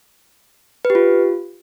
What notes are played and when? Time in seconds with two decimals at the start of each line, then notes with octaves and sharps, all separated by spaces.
0.85 B4
0.90 G4
0.95 F4